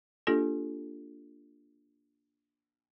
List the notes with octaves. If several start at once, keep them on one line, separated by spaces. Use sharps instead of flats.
A#3 D4 F4 G4 A4